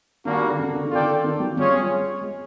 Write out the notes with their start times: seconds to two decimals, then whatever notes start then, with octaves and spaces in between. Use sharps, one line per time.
0.25 D#3 G3 A#3 D4 F#4
0.49 D3
0.59 C#3
0.74 D3
0.84 D#3
0.91 D3 F4 A4 D5 G5
1.24 D#3
1.40 F#3
1.57 G3 C#4 F4 G#4 C#5
2.22 G#3